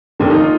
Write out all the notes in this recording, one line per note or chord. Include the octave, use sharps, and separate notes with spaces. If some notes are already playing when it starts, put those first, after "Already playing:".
F1 D#2 D3 A#3
D#4
F4